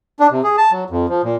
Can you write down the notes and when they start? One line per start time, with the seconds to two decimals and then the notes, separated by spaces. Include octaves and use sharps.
0.20 D4
0.31 C3
0.43 G#4
0.58 A5
0.72 F#3
0.90 F2
1.09 F3
1.23 A#2